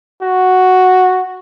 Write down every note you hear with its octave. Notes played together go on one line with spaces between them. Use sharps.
F#4